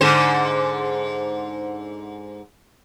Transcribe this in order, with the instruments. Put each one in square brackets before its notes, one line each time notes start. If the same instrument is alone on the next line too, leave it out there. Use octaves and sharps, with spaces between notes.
[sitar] G#2 D3 C5